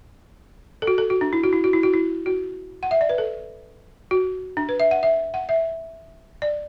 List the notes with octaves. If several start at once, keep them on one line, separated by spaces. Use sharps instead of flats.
A4
F#4
A4
F#4
D4
E4
F#4
E4
F#4
E4
F#4
E4
F#4
F#5
E5
D5
B4
A4
F#4
D4
B4
E5
F#5
E5
F#5
E5
D5